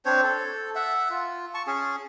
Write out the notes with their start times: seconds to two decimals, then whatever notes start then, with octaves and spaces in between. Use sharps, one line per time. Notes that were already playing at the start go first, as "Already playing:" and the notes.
0.06 C4 D4 C5 C#5
0.23 A4
0.75 E5 F#5
1.10 F4
1.54 A5 C#6
1.67 C#4 G#4